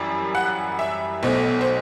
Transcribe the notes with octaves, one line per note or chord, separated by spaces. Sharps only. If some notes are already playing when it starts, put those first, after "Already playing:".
Already playing: F#2 E3 G3
F#5
E5
B1 B2 A3 C5
C5